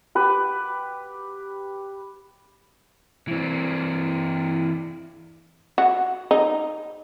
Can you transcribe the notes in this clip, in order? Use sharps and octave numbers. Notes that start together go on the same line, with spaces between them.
G4 B4
E3 C4
F#4
D#4